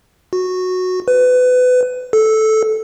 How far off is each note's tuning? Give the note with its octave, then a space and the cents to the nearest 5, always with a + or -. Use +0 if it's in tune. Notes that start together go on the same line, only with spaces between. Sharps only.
F#4 -10
B4 +25
A4 -10